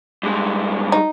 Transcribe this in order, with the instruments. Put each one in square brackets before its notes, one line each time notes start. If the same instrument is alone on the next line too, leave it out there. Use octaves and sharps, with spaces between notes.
[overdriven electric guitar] G2 G#3
[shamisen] D#4